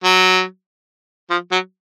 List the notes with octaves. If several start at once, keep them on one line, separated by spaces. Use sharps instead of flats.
F#3
F3
F#3